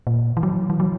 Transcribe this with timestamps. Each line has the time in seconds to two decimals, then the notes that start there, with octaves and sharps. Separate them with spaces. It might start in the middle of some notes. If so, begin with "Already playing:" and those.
0.07 A#2
0.37 E3
0.43 F#3
0.70 E3
0.80 F#3